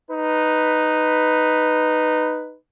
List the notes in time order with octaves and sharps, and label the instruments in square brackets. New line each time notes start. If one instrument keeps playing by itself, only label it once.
[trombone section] D#4 B4